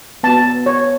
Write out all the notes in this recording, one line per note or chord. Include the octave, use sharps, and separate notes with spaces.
B3 F#4 A5
C#5